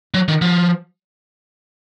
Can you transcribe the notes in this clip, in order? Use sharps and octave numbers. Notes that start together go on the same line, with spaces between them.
F#3
D#3
F3